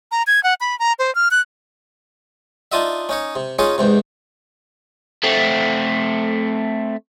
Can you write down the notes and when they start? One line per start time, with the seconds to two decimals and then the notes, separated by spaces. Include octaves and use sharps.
0.12 A#5
0.27 G#6
0.43 F#5
0.61 B5
0.79 A#5
0.99 C5
1.15 F6
1.31 F#6
2.72 D4 D#4 F4 D#5 E5
3.09 C#4 D#4 C#5
3.36 C3
3.59 C#4 D#4 F4 G#4 C#5
3.78 E2 G#2 C3
5.24 A3 C4